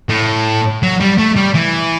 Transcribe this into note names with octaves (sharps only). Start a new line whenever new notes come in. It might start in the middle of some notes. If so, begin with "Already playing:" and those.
A2
F#3
G3
A3
G3
E3